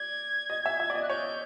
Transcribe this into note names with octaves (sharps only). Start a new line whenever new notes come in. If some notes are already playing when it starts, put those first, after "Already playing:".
Already playing: D5 G#6
D#5
E5
E5
D5
D#5
F#6
C#5 G6